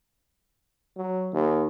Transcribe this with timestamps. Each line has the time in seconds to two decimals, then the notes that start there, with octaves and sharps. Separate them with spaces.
0.97 F#3
1.33 D#2